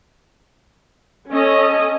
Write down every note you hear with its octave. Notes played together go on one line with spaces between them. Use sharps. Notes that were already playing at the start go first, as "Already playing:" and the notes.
C#4 A4 D#5